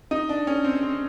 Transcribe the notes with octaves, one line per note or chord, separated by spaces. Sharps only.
D#4
D4
C#4
C4
C4